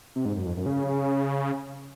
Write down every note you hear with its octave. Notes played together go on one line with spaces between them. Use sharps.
C3
G#2
F#2
F2
F#2
C#3